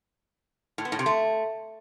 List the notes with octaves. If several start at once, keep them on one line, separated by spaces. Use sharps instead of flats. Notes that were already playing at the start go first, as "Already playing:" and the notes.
A2
B3
A2
C3
A3